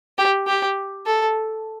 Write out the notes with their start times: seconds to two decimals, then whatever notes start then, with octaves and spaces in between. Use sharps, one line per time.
0.18 G4
0.47 G4
1.06 A4